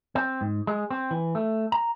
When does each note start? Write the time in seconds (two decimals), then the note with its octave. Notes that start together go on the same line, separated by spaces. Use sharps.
0.15 C4
0.41 G#2
0.67 G#3
0.91 C4
1.11 E3
1.35 A3
1.72 A#5